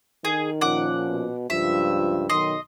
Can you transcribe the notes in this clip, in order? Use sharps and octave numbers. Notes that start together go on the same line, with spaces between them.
D#3 G#4
A#2 F3 C#4 F#5 D6
B2
C#2 G2 F3 F4 E5
B1 D#3 F#3 D#5 C6